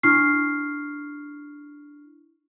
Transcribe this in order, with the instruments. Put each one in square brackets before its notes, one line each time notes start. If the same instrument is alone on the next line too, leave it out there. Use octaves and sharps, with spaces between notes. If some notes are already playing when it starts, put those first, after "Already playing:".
[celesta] D4 E4 C#6 F6 C7